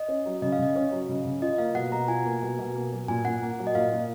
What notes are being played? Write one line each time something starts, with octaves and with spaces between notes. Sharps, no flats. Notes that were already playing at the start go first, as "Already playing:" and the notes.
Already playing: D#5
C#4
F#3
C#3 D#5
F5
C#3 D#5
C#4
F#3
C#3
C#3
F4 D#5
A#3 F5
B2 F#5
B2 A#5
F4 G#5
A#3
B2
B2
A#3
F#3
A#2 G#5
A#2 F#5
A#3
F#3
D#5
A#2 F5
A#2